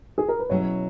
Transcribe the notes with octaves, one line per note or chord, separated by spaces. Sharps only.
G#4
A#4
B4
B2 F#3 C#4 E4 G#4 C#5